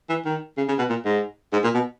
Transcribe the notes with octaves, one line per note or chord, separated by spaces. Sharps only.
E3
D#3
C#3
C#3
B2
A#2
G#2
G#2
A#2
B2